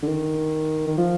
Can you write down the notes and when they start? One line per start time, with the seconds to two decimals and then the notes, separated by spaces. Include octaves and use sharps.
0.03 D3
0.08 D#3
0.87 D#3
0.98 F3